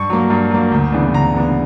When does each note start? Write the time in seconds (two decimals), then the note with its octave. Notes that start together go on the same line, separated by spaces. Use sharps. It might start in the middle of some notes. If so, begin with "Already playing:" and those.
Already playing: G2 C#6
0.10 F#3 A#3
0.30 G2
0.51 F#3 A#3
0.71 D2
0.92 C#3 E3 B3 D4
1.14 D2 A#5
1.34 C#3 E3 B3 D4